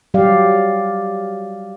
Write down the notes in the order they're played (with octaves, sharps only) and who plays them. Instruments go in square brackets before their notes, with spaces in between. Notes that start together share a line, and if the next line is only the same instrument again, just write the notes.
[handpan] F#3 G3 G4 D5 F5